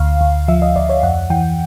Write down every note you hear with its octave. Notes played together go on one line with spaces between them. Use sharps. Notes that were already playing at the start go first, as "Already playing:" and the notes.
Already playing: D2 F5
D2
F3 E5
D#5
D2 D5
C#5
F2 F#5
E3 G5